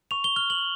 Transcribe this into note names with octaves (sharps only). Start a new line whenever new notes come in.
C#6 F7
G7
F6 G7
F#7